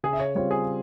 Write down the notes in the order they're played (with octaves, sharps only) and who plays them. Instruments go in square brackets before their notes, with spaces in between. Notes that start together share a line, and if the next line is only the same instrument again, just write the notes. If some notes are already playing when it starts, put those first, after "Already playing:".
[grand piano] C#3 [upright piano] G#4
[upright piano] E5
C#5
[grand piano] G3 C4 F4 [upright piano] C#5
[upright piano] G#4